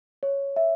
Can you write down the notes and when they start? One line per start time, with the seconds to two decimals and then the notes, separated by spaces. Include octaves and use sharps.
0.23 C#5
0.56 E5